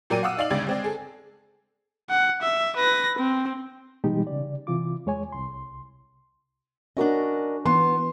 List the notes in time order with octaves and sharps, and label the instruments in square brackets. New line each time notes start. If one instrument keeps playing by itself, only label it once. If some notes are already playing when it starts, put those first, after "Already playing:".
[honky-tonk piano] A#2 F#3 A#4 D5 G5 D#7
F5 F#5 D6 E6
D#4 D5 F5 F#7
D2 C#3 G#3 G4 D5 G#6
G#3 C4 D5
G#4 A4
[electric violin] F#5
E5
B4 A#6
C4
[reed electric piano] B2 E3 G3 G#3 D#4 G4
C#3 D5
C3 E3 F4 D6
E2 G#3 C#5 G#5
C2 C6
[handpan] C#4 F#4 [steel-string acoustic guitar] D4 A#4 D#5
[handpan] E3 [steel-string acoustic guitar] B3 [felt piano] C6